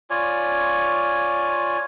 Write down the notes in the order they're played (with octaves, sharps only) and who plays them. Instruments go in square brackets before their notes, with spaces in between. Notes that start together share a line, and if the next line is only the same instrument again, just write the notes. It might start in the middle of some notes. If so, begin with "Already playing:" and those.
[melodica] F4 C#5 D5 G#5